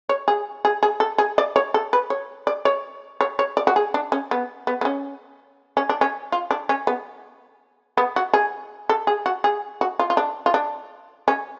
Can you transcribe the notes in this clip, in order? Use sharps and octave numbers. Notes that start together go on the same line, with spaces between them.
C#5
G#4
G#4
G#4
A4
G#4
D5
C#5
A4
B4
C#5
D5
C#5
C#5
C#5
D5
F#4
G#4
D4
C#4
B3
B3
B3
C#4
C#4
D4
C#4
F4
D4
C#4
B3
B3
F#4
G#4
A4
G#4
F#4
G#4
F#4
F4
F4
D4
F4
D4
C#4